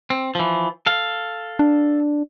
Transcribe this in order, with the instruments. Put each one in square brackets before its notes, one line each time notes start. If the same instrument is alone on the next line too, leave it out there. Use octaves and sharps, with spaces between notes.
[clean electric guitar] C4
E3 F3
A4 F5
[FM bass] D4